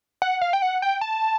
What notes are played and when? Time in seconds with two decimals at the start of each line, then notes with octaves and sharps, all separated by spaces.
0.22 F#5
0.41 F5
0.53 G5
0.62 F#5
0.82 G5
1.01 A5